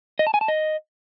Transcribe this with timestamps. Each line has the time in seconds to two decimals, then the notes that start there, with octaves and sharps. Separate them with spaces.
0.19 D#5
0.27 A5
0.34 G#5
0.41 A5
0.48 D#5